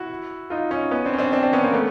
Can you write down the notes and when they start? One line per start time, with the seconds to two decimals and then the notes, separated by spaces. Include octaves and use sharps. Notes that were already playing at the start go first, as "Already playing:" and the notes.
Already playing: E4 F#4
0.50 D#4 F4
0.71 C#4 D#4
0.91 B3 C#4
1.05 C4 D4
1.13 C#4
1.18 C4 D4
1.32 C4 D4
1.43 C4 D4
1.53 B3 C#4
1.63 A#3 C4
1.74 A3 B3